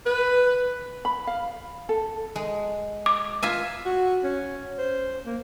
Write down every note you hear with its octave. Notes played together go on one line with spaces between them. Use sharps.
B4
B5
F5
A4
G#3
D6
F4 E5 G#5
F#4
C#4
C5
A#3